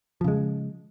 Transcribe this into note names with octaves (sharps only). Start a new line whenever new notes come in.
C#3 F3 G#3